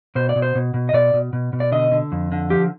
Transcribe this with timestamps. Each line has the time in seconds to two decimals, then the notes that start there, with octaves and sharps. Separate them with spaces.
0.15 B2 C5
0.29 D5
0.36 B2
0.42 C5
0.55 B2
0.74 B2
0.89 D#5
0.93 B2 D5
1.14 B2
1.33 B2
1.53 B2
1.60 D5
1.72 D3 D#5
1.92 D3
2.12 F2
2.32 D3
2.50 F3 G4